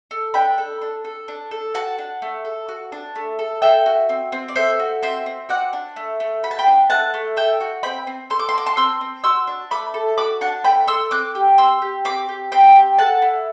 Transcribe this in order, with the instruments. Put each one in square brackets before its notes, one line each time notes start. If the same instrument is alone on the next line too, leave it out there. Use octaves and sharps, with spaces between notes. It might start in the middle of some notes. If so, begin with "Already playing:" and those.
[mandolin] A4
D4 G5 B5
A4
D4
A4
D4
A4
F#4 F#5 A5
D4
A3
A4
F#4
D4
A3
A4
A4 E5 G5
F#4
C4
C4
D5
A4 C5 E5
F#4
C4 C5 E5
C4
F#4 D5 F#5
D4
A3
A3
F#4 B5
A5
G5 B5
D4
A3 F#5 A5
A3
A4 E5 G5
F#4
C4 G5 B5
C4
A4 C6
D6
C6
F#4 D6
A5 C6
C4 C6 E6
C4
F#4 C6 E6
D4
A3 B5 D6
A4
F#4 B5 D6
D4 F#5 A5
A3 G5 B5
A4 C6 E6
C4 D6 F#6
G4
C4 C6 E6
G4
C4 B5 D6
G4
C4 G5 B5
G4
A4 F#5 A5
E4